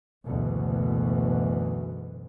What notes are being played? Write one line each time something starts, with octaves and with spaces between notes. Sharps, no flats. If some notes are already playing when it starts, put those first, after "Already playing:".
F#1 D2 B2 E3